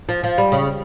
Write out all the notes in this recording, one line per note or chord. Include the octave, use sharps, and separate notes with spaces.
F3
F3
G3
C#3